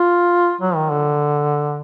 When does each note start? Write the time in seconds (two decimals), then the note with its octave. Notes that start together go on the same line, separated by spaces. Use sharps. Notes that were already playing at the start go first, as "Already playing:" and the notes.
Already playing: F4
0.61 F#3
0.76 D#3
0.90 D3